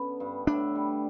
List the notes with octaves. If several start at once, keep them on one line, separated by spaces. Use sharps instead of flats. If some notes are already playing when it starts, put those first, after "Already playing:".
Already playing: D3 B3 C#4
G2
A2 D4
G3